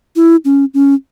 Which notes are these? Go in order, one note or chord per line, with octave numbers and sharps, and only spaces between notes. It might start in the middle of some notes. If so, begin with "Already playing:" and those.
E4
C#4
C#4